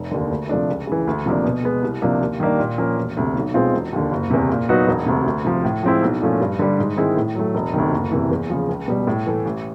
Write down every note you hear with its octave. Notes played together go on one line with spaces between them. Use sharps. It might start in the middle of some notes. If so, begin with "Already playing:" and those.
Already playing: F1
D#2 D3
D2
C3 F3 A3 D4
C#2
C#3 E3
D2
C3 F3 A#3 D4
B2
G#3 B3
C2
C3 F3 A#3 D4
D#2
D#3 G3 A#3 D4
A#2
F3 A#3 C#4
E1
D2 C3
B1
B2 G#3 C4 F4
E1
D#2 D3
F#1
E2 C3
A#2
F#3 B3 D#4 F#4
E1
D2 C3
D2
C3 F3
A2
F3 G#3 C4 E4
B1
A#2 F3 A3 C#4
G2
D3 G3
G#2
D#3 G#3 C4 E4
A2
F#3 A3
E1
D2 C3 D#3
F#1
E2 C3 E3
E2
C#3 F3
C#2
B2 G3
A2
E3 A3
A1